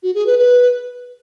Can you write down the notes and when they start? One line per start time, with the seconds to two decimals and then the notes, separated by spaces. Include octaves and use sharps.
0.03 F#4
0.15 G#4
0.27 B4
0.38 B4